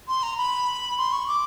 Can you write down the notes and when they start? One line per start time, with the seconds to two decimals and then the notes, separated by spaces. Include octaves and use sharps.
0.08 C6
0.23 A#5
0.38 B5
0.98 C6
1.13 C#6
1.28 D6